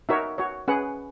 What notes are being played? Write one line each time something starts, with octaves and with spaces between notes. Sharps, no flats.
D#4 F#4 A#4 C#5 E5
F#4 C#5
C#4 G#4 B4 F#5